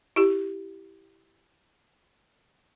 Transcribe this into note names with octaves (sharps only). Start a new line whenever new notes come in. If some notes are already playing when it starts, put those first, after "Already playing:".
E4 G4